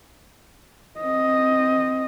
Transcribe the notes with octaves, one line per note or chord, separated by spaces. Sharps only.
C4 D#5